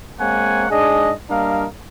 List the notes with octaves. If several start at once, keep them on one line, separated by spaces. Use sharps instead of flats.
G#3 A#3 C4 C#5 F#5 G#5
G#2 D4 G#4 D#5
G3 A#3 D4 A#4 D#5 F5